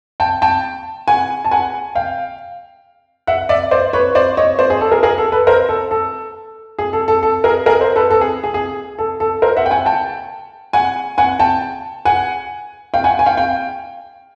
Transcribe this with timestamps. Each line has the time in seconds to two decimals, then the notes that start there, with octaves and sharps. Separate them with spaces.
0.20 G5 A5
0.42 G5 A5
1.08 F#5 G#5
1.45 A5
1.51 F#5 G#5
1.95 F5 G5
3.27 E5 F#5
3.49 D5 E5
3.71 C5 D5
3.93 B4 C#5
4.15 C5 D5
4.37 C#5 D#5
4.59 C5 D5
4.70 G#4
4.81 A4
4.91 G#4 A#4
5.03 G#4 A#4
5.18 A4
5.32 A4 B4
5.47 A#4 C5
5.69 A4
5.91 A4
6.79 G#4
6.93 A4
7.08 A4
7.23 A4
7.44 G#4 A#4
7.66 G#4 A#4
7.81 A#4 C5
7.96 A4 B4
8.11 A4
8.21 G#4
8.44 G#4
8.54 G#4
8.99 A4
9.20 A4
9.42 A#4 C5
9.56 E5 F#5
9.66 G5
9.71 F#5 G#5
9.86 G5 A5
10.73 F#5 G#5
11.18 F#5 G#5
11.40 G5 A5
12.05 F#5 G#5
12.94 F5 G5
13.04 F#5 G#5
13.19 G#5
13.26 F5 G5
13.37 F5 G5